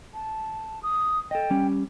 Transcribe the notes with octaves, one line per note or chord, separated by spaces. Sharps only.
A5
D#6
A4 D#5 G5
G3 C#4